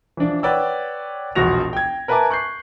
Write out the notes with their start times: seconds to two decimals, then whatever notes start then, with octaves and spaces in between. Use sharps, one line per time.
0.17 E3 F3 D4 D5
0.43 B4 C#5 D5 F#5 G5 E6
1.35 E1 A#1 F#4 A#6 F7
1.73 G5 G#6
2.08 A#4 B4 E5 G#5 A5 D6
2.30 C#6 F#6 G6 C7